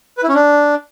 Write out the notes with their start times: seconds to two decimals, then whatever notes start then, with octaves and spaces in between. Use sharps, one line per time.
0.18 B4
0.23 E4
0.29 C#4
0.34 D4